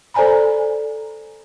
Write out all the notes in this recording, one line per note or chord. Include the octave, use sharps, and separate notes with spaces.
A4 C5 D5 G#5 A#5 B5